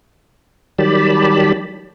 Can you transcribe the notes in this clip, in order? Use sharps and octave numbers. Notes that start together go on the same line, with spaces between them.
D#3 F#3 G3 G4 A5 B5